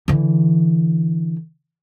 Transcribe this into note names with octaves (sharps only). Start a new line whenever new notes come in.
D3 E3